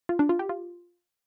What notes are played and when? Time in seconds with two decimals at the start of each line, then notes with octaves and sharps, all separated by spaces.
0.09 F4
0.19 D4
0.29 F4
0.39 G4
0.49 F4